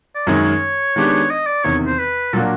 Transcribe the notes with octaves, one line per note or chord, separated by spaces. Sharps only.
D5
F#2 D#3 G#3 C#4 C#5
D#3 G#3 B3 D4 G4
D#5
D5
E2 C3 D#3 C#5
C5
B4
A#2 F#3 A#3 D4 F#4 A4